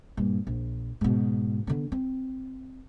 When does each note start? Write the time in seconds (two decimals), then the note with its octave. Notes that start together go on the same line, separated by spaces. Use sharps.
0.17 G2 A#2
0.47 A#1
1.01 G#2 B2
1.67 D3 B3
1.92 C4